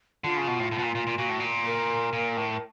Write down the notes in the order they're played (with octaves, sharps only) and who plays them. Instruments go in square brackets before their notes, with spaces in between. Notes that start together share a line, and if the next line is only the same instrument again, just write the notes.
[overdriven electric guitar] D3 [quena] F4
[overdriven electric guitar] C#3
B2
A2
A2
B2
A#2
A#2
A#2
[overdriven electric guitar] A#2 [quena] F#4
[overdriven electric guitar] A2
A#2
[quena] A#4
[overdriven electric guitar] A#2
A2